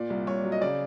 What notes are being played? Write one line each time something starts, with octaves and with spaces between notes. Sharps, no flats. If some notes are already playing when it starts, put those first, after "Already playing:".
Already playing: A#2 D5
C2
C2 C#5
F#3
D#5
C#3 D5